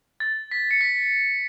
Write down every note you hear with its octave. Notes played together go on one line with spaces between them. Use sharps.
A6
B6
C#7
B6